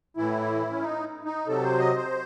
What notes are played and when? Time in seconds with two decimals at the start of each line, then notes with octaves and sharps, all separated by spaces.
0.17 A2 E3 E4
0.72 C#4
0.82 D#4
1.25 D#4
1.47 C3 F#3 A4
1.63 C5
1.79 D#5
1.97 C5